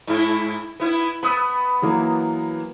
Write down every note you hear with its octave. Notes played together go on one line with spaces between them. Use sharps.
G#2 E4
B3 E4
B3 B5 D#6 E6
E3 F#3 A#3